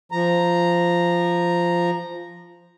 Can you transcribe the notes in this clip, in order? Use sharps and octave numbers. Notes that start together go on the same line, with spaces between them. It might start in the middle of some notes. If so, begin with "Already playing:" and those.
F3 A#5